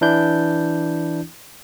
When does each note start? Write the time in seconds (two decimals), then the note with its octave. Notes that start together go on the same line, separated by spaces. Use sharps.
0.01 E3 D4 E4 G6